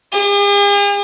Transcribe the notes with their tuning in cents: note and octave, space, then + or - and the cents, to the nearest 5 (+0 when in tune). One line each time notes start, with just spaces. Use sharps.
G#4 -45